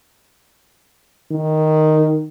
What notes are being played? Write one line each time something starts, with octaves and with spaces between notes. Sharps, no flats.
D#3